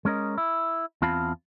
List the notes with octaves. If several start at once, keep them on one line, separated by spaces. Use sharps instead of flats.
G#3 C#4 A#4 D#5
E4
E2 C4 F4 F5 A5 B5